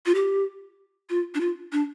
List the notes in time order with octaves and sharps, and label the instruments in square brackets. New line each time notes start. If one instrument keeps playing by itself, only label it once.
[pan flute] F4
G4
F4
D4
F4
D4